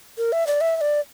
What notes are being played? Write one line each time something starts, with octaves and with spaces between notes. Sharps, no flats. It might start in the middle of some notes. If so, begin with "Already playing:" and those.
A#4
E5
D5
E5
E5
D5